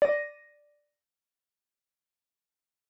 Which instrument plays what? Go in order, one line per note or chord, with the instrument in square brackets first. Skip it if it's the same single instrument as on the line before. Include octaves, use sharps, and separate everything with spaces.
[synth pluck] D5 A#6 D#7